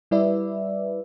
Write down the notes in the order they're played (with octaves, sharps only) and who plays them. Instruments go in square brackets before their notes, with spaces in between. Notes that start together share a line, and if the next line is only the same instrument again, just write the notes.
[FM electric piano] G3 E4 B4 D5 E5